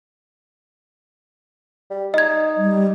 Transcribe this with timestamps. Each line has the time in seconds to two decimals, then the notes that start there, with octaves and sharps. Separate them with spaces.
1.90 G3
2.14 D#4 D#5 G#6
2.57 G3